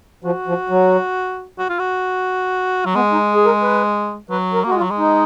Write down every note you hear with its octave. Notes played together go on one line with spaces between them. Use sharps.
F3 F#4
F3
F#3
F#4
F4
F#4
F#3
G#3 B3
D#4
G#4
A#4
B4
F#3 B4
A#4
A#3 F#4
G#3 F4
F#3
G#3
D#4